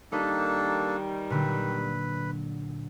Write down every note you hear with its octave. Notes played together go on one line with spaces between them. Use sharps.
D#3 G3 A#3 D4 D#4 A4 B4
A#2 D3 F#3 B4